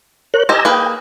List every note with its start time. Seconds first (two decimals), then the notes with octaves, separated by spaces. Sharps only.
0.34 A#4 C#5 F#6
0.49 G4 D#5 G#5 A#5 E6
0.65 A#3 G#4 B4 G5